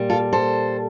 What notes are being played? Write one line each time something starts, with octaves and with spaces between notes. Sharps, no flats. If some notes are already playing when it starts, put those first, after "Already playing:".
Already playing: A#2 G3
F4 A4
A4 C5